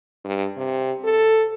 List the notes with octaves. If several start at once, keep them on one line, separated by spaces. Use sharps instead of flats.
G2
C3
A4